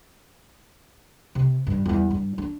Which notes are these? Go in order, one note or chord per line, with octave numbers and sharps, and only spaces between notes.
C3
G2
E2 G3
G2
D4